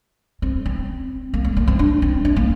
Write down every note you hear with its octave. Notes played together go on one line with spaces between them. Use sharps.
C4
C4
A#3
A#3
A#3
C4
D4
C4
D4
A#3